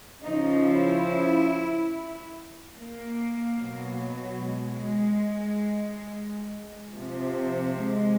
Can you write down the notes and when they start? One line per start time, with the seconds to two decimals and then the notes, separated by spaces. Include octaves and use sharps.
0.23 C#3 F3 D#4
0.65 E4
2.74 A#3
3.58 B2 F#3
4.42 G#3
6.93 C3 F3
7.76 G#3